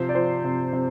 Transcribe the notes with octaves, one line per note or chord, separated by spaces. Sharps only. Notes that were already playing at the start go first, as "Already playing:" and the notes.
Already playing: C3 F3 C5
D5
F3 C5
C3
C3